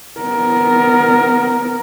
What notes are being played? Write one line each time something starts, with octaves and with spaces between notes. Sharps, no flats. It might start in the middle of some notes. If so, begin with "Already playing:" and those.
B3 A#4